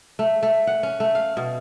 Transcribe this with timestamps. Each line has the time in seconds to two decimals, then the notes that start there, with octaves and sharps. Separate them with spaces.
0.19 A3
0.43 A3
0.67 F#5
0.83 C#4
1.00 A3
1.15 F5
1.37 B2